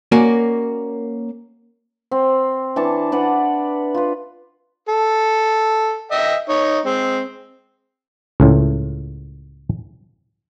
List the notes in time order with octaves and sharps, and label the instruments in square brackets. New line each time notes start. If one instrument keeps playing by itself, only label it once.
[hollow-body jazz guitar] A#3 C#4 F#4 D5
[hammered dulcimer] C4
E3 D4 A5 C#6
D4 B4 D5 F#5
F4 B4
[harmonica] A4
D#5 E5 G5
D#4 C#5
G#3 C4
[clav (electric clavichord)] C#2 A2